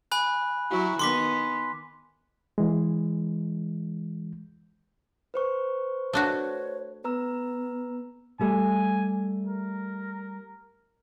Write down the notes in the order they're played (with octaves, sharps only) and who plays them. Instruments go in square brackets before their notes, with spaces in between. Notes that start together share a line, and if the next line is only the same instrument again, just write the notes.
[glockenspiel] G#5 B5 F#6
[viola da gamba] F#3 E4 F#4
[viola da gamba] D#3 B3 [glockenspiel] C6 D6 B6
[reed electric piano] E3 G#3
[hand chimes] B4 C5 C#6
[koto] A3 D4 F#4 [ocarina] C#5
[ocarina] B3 [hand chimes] B4 A#5 E6
[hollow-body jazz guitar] G3 A3 [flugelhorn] G#5
[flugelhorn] A#4